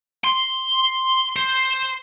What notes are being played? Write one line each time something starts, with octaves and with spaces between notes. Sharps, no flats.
C6
C5